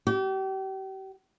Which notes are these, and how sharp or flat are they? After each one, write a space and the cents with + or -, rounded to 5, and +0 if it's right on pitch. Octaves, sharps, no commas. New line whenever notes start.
G4 -35